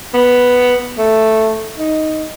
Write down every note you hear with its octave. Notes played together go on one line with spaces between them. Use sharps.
B3
A3
D#4